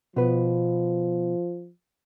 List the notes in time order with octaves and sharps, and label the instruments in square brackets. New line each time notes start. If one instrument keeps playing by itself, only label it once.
[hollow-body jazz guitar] B2 B4 [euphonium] F3